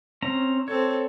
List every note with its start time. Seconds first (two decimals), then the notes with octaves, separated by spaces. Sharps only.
0.22 C4 C#4 A#5
0.68 C4 A4 C#5